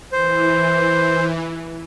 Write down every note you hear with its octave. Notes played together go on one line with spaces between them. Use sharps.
E3 C5